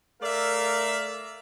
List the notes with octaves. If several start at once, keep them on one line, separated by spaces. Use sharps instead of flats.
A3 A#4 D5 E5 F5